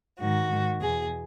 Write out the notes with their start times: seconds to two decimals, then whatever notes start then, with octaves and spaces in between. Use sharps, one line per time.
0.19 G#2 D#3 F#4
0.49 G#2 D#3
0.80 E2 B2 G#4